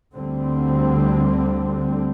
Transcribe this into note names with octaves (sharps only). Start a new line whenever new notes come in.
D2 D3 G3 C4